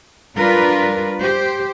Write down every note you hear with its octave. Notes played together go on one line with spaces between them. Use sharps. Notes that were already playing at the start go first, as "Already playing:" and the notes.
G3 D4 F4 A#4 B4
G4 C5